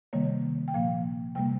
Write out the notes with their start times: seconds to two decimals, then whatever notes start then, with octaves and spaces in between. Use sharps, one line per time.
0.13 C3 D#3 G3 A#3 C#5
0.68 G5
0.74 A#2 F3 A#3 F5
1.35 C3 G3 A#3 G5